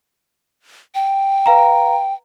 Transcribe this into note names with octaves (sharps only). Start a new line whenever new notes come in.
G5
B4 F5 A#5